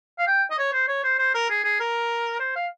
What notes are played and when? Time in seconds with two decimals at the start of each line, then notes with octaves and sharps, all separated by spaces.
0.19 F5
0.27 G5
0.51 D#5
0.58 C#5
0.73 C5
0.88 C#5
1.04 C5
1.19 C5
1.34 A#4
1.50 G#4
1.64 G#4
1.80 A#4
2.40 C5
2.56 F5